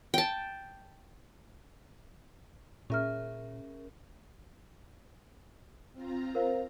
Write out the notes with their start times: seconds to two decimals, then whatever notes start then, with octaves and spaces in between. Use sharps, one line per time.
0.14 G5 A5
2.90 A#2 C#4 G#4 A#4 E5 F6
5.93 C4 F4 A#5
6.35 A#4 C5 F5